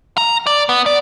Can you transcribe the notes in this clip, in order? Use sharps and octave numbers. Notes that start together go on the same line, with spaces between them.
A#5
D5
B3
D5